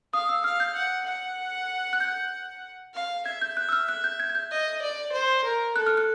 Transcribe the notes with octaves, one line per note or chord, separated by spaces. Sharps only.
F5 D#6
E6
F5 F6
G6
F#5
F#5
F#6
G6
F5
E5 G#6
G6
F#6
E6
F6
F#6
G6
G#6
G#6
G6
D#5
D5
C5
A#4
A4 F#6
F6
F#6